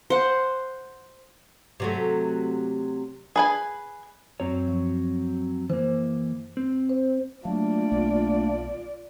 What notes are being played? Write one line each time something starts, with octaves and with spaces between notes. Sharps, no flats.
C5 F#5
C3 F#3 A3
G#4 B4 G#5
F#2 F#3 C4 C#5
F3
E3 A#3 C5
C4
C5
F#3 A3 A#3 D4 F4 D5
B1